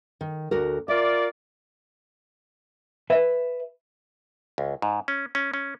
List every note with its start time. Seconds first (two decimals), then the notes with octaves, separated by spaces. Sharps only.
0.21 D#3
0.51 D2 F#4 A#4
0.88 F4 A#4 D5 E5
3.10 B4 E5
4.58 C#2
4.82 G#2
5.08 C#4
5.35 C#4
5.54 C#4